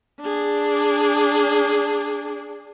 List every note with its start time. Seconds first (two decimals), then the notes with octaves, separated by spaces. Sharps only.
0.21 D4 G#4